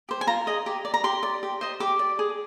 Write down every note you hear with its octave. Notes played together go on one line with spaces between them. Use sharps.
G4 C5
G#5
F4 A#5
G#4 D#5
G4
D5
A#5
G4 C6
D5
G4
C5 D#5
G4 D6
D5
G#4